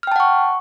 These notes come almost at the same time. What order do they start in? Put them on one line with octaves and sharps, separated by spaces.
F6 G5 A5 F#5 C#6